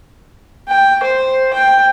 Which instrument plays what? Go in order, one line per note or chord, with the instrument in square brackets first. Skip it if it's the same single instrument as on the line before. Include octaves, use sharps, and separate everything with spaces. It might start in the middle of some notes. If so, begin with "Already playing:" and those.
[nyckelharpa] G5
C5
G5